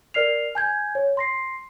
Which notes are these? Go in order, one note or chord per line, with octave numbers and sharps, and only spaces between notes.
A#4 D5 F6 C7 F7
G#5 G6 G#6
C#5
C6 A#6 C7